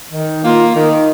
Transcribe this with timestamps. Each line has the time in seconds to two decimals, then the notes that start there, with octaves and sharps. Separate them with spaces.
0.12 D#3
0.43 A#3 F4
0.75 D#3